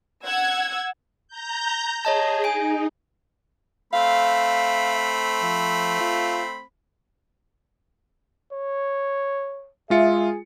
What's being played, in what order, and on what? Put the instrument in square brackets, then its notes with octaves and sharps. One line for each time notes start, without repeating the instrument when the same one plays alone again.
[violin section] F#5 E6 G#6
[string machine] A#5 G6
[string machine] G#4 [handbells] C#5 D#5 A5
[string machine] D#4 [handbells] G#5 D7
[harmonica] A3 C4 B5 [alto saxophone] F5
[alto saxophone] F3
F4
[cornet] C#5
[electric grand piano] G#3 F4 C#7 [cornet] G#4 [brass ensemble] E5